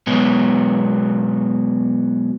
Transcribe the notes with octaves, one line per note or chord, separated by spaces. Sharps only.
B2 F#3 G#3 B3